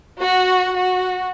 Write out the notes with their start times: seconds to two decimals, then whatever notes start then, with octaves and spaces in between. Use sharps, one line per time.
0.19 F#4
0.77 F#4